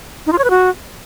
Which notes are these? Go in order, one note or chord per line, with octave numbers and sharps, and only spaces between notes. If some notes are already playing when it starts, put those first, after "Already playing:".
D#4
F4
C#5
B4
F#4